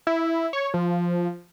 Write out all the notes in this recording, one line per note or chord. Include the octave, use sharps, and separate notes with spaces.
E4
C#5
F3